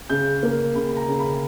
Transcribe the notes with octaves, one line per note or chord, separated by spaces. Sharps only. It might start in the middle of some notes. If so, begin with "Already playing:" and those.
C#3 G6
A#3
C#3 B5
B5
A#5
C#3
B5